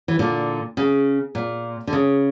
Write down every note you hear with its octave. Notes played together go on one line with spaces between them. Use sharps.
E3
A#2 D3
C#3
A#2
D3
C#3